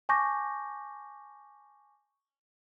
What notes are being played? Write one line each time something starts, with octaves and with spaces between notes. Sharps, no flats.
G#5 A5 C#6 D6 G6 A#6